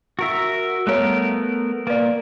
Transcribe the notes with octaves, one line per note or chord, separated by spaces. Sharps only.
F#4 A#4 E5
G3 A3 B3 A#4 C#5
A#3 B4 D5